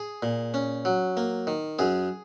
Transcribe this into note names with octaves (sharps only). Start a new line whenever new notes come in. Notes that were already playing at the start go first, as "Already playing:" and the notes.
Already playing: G#4
A#2
C#4
F#3
A#3
D#3
F#2 G#4